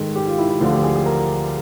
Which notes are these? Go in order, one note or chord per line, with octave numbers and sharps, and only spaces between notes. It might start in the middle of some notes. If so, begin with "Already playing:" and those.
Already playing: G#2 D#3 A4
G4
F4
E4
E4
D2 D3 F3 F4
G4
G#4
G#4
A#4